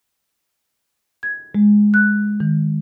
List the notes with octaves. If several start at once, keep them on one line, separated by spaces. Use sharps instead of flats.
G#6
G#3
F#6
D#3